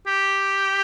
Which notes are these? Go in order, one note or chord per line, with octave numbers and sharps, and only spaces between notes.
G4